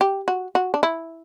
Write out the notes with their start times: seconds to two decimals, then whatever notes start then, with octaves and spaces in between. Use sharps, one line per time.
0.01 G4
0.28 F#4
0.55 F#4
0.74 D4
0.83 E4